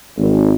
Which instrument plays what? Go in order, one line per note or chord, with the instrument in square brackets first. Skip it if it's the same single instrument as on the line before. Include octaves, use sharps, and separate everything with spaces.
[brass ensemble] G#1